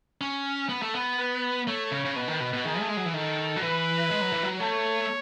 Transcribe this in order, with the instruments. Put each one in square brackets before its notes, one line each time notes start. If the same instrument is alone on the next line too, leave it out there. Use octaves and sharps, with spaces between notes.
[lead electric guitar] C#4
B3
A3
B3
[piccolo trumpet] B4
[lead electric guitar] A3 [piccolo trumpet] C#5
[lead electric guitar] C#3
C#3
[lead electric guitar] B2 [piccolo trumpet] B4
[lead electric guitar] D#3
B2
B2
[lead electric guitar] D#3 [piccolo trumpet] G#4
[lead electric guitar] A3
G#3
F#3
E3
[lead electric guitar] D#3 [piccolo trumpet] A4
[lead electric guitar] F#3
[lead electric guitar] E3 [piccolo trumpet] B4
[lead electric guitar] G#3
F#3
E3
F#3
[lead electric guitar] A3 [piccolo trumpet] C#5